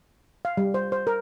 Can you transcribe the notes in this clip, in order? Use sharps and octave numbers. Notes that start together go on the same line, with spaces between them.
F5
G3
C5
C5
A#4